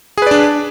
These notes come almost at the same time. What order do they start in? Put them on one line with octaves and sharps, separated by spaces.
G#4 B4 D5 D4